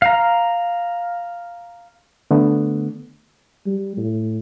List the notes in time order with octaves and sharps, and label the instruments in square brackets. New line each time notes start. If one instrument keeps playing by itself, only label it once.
[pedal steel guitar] F5 A#5
[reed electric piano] D3 A3 B3
[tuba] G3
A2